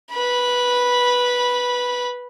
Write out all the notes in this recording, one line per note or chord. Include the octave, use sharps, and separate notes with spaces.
B4 B5